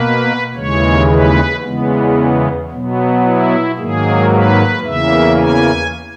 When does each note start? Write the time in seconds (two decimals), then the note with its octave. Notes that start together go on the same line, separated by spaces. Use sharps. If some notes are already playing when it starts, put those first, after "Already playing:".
Already playing: B2 A#3 B4
0.54 D#2 C#3 E3 G#3 C#5
1.08 B4
1.62 E2 C#3 E3 G#3 B3
2.70 B2 F#3 B3
3.23 E4
3.77 G#2 D#3 F#3 A#3 G#4
4.31 B4
4.85 E2 C#3 E3 A#3 E5
5.39 G#5